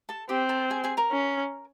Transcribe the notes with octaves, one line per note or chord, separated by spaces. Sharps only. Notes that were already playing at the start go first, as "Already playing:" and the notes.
A4 A5
C4 G4 G5
A4 A5
G#4 G#5
G#4 G#5
A#4 A#5
C#4